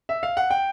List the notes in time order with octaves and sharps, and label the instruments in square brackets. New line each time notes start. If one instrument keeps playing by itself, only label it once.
[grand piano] E5
F5
F#5
G5